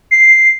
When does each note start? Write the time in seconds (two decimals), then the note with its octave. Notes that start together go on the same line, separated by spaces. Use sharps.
0.11 C7